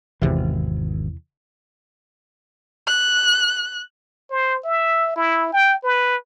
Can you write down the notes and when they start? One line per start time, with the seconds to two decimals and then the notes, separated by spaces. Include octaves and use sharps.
0.21 G#1 E2 C3 E3
2.87 F#6
4.30 C5
4.64 E5
5.16 E4
5.53 G5
5.83 B4